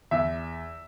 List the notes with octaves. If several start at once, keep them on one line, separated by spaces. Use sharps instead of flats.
E2 E5